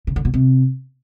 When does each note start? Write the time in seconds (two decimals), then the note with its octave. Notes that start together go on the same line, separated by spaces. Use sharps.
0.07 C#3
0.16 D3
0.25 B2
0.34 C3